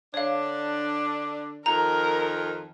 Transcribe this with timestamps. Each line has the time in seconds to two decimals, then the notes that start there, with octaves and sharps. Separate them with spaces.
0.14 D3 D4 C#5 F5
1.66 F2 D#3 A#4 A#5